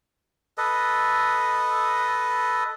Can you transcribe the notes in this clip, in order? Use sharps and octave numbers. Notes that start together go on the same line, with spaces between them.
A4 B4 D#5